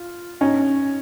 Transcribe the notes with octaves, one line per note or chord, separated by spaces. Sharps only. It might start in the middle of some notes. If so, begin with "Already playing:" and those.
Already playing: F4
C#4 D#4